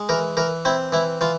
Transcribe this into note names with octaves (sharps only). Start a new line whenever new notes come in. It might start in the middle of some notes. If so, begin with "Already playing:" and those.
Already playing: G#3
E3 A#4
E3 A#4
C4 E4
E3 E4
E3 F4